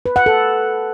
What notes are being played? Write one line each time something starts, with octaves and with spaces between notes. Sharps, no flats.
B4
F#5
A4